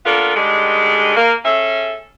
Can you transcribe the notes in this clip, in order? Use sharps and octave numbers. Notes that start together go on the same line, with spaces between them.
A#3 B3 D4 F4 A4 A#4
D3 D#3 G3 G#3
A#3
C#4 G#4 A4 E5